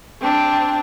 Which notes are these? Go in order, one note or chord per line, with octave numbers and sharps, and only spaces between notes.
C4 D4